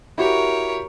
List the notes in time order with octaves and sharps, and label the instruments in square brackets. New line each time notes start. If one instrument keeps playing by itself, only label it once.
[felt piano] E4 F#4 G4 [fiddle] A#4 C#5